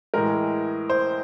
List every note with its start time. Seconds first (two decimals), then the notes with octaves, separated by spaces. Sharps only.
0.14 A2 E3 G#3 A#4
0.90 C5